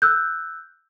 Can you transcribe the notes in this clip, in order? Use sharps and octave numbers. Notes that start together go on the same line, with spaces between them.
E6 F#6 G6